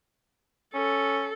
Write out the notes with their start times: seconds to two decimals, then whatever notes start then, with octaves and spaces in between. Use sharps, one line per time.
0.74 C#4 A4